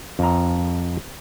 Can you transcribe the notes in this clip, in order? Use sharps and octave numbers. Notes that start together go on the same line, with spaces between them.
F2 A#5